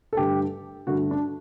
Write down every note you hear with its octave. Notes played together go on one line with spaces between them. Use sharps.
A4
G2 D3 A3 G4
G2 D3 A3 F#4
D4